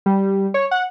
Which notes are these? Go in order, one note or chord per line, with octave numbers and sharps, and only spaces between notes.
G3
C#5
F#5